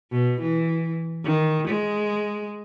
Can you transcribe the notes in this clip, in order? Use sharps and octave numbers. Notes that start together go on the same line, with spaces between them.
B2
E3
D#3
G#3